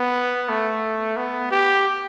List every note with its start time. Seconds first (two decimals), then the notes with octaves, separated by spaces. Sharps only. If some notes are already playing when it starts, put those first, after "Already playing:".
Already playing: B3
0.49 A3
1.16 B3
1.51 G4